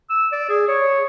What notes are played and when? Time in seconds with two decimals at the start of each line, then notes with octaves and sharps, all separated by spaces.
0.10 E6
0.32 D5
0.49 G#4
0.68 C#5